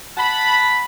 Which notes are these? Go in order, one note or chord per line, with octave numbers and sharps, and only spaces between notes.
F#5 A5 B5